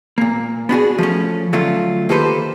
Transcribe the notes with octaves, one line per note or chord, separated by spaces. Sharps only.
A#2 A#3
B3 D4 F#4 G#4
F3 A3 C#4
D3 F#3 A3 C#4 F4
D#3 A#3 G4 A4 B4 C5